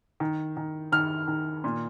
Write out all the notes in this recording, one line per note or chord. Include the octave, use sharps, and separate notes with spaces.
D#3
D#3
D#3 F6
D#3
A#2